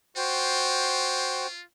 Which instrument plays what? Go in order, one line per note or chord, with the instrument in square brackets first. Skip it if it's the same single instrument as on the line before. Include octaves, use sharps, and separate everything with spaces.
[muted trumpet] F4 [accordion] F#4 C5 G5